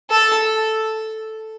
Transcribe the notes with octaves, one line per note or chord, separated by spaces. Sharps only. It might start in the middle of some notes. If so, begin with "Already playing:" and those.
A4